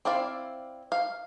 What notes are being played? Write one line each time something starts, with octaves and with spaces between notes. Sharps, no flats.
C4 E4 D5 F5
F5